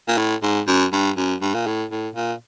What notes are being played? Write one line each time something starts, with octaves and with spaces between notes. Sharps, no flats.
A#2
A2
G#2
F#2
G2
F#2
G2
A#2
A2
A2
A#2